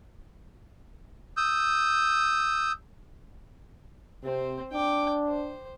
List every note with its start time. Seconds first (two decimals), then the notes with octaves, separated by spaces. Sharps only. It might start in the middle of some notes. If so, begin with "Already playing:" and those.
1.37 D#6 E6 G6
4.24 C3 C4 C5
4.73 D4 G5 D6
5.28 C5